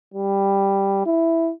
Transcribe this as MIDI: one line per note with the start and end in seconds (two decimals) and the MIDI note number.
0.14 1.06 55
1.06 1.51 64